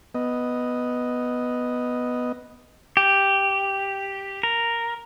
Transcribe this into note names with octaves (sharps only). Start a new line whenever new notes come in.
B3 D#5
G4
A#4